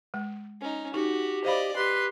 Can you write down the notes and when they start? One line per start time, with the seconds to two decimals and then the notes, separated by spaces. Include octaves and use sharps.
0.14 G#3
0.61 C#4 D#4
0.94 D#4 F#4 G4
1.45 C5 D5 D#5 F5 B5
1.76 G4 B4 C6